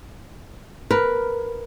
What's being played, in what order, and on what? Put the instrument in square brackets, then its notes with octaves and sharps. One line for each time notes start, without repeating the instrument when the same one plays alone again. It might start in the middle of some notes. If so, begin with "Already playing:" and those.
[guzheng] A#4 [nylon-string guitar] B4